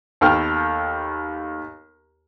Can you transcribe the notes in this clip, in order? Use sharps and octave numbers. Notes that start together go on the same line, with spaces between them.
D#2 B3 A4 G5 F6